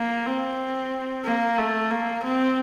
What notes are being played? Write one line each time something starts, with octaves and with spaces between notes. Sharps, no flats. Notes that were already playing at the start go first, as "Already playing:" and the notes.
Already playing: A#3
C4
A#3
A3
A#3
C4